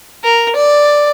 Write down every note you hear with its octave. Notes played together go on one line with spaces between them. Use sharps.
A#4
D5